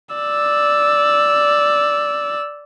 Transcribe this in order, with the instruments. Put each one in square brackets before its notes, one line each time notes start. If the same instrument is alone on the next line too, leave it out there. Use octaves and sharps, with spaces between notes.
[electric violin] D5 E6